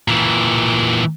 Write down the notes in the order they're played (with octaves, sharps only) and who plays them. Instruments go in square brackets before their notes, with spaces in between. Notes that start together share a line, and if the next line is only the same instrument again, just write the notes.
[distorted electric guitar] A#2 E3